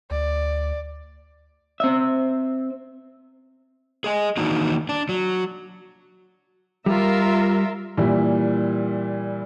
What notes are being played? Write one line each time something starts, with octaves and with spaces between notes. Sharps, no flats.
D2 D5
C4 E5
G#4 D#5 G#5
D#3 E3 A#3 D4 D#4 F#4
D4
F#3
G3 F4 A#4 E5
A#2 E3 G3 E4